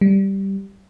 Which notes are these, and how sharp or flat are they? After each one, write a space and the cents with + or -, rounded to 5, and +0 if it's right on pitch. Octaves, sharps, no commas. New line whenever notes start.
G3 -5